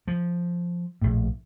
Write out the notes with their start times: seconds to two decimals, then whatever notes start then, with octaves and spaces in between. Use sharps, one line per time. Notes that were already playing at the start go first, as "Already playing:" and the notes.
0.07 F3
1.01 A#1 A2